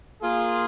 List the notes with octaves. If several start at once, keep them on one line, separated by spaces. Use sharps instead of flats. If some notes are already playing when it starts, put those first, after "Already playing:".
A#3 F4 G#4